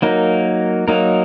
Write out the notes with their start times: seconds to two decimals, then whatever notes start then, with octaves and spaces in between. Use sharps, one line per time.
0.02 F#3 A#3 D#4 A#4
0.88 F#3 A#3 D#4 A#4